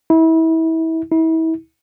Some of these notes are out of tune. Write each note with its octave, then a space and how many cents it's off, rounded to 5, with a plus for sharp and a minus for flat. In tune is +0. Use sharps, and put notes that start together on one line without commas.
E4 -30
E4 -35